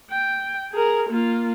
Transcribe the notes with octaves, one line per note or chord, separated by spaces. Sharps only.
G5
G#4 A#4
A#3 F4